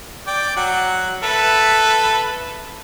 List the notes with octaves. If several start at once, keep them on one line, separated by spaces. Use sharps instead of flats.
D5 G5
F#3 F#5
A4 B4 E5